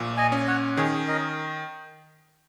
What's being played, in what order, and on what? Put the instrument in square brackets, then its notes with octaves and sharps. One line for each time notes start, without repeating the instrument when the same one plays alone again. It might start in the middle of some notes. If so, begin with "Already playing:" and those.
Already playing: [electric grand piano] A#1 A#2
[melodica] D#5 G#5
[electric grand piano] C#4
[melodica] C#5 F#5
[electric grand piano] D#3 [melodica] G#4 C#5
[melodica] A#4 D#5